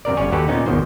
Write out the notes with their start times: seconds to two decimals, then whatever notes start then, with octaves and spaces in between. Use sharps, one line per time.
0.05 F#2 C3 A#4 D5
0.17 G1 C#4 C#5 D5 G#5
0.31 D#2 F#4 G4 A4 B4 F#5
0.48 A#2 B3 C#4 D#4
0.66 G#1 E2 B2 D#3 C5